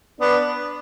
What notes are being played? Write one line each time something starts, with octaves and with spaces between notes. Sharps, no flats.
B3 D4